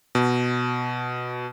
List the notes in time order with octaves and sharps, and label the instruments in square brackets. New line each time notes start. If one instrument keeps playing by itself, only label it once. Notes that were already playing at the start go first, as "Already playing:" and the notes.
[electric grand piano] B2